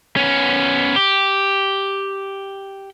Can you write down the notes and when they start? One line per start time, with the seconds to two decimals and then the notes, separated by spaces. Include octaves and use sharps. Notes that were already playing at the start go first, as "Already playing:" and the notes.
0.17 B3 C#4
0.96 G4